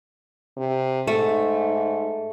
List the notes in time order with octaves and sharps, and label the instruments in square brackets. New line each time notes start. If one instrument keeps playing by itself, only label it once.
[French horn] C3
[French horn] G#2 [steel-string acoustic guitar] A3